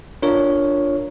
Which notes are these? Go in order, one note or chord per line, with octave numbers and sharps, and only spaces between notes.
D4 F4 A#4 C#5